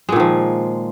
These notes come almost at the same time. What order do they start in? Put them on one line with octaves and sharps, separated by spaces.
G#3 A#2 D#3 F3